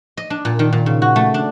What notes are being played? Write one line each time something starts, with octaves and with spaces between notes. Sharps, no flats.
D#5
D4
A#2
D#3
A#2
C#3
F#4
A3
D4